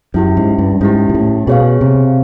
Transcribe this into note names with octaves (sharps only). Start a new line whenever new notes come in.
F#2 C#4 E4 G4
G#2
G2
G#2 C#4 E4 G4
A#2
A2
B2 G#4 C#5 F5
C3